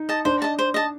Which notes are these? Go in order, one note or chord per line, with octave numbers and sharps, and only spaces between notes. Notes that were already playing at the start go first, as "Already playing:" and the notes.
Already playing: D#4
D#5 A5
D4 C5
D#5 A5
C5
D#5 A5